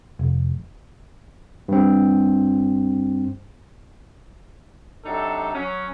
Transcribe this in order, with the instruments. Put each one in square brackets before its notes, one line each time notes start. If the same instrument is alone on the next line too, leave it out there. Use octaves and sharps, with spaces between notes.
[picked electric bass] F1
[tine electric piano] G2 C4
[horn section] C3 F#3 D4 D#4 A4
F#3 C#4